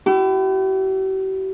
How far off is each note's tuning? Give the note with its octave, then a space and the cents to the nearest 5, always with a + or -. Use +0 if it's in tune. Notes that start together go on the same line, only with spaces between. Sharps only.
E4 +25 G4 -45